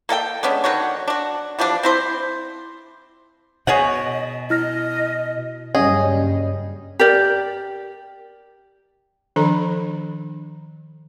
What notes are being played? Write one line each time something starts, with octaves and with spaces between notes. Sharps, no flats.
A#3 A4 D#5 G5
G#3 B3 C#4 D4
D3 D#3 F#4 C#5
D4 F#4
E3 F3 G3 D4
C4 E4 C5
B2 G#4 C#5 D#5 F#5
E4 D#5 F6 A#6
F#1 G2 G3 C#4 G#4 D#5
G4 A#4 D5
D#3 F3 D4 A4 A#5 B5